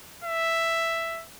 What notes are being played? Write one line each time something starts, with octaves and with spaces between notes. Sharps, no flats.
E5